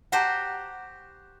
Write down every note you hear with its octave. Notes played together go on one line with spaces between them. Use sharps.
F#4 G4 C5 F#5 A5 A#5